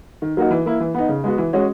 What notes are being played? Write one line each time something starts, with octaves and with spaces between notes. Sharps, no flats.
D#3
F#3 A#3 D#4 F#4
E3
A#3 E4
E3
B3 D#4
C#3
G#3 B3 F#4
E3
G#3 C#4 F#4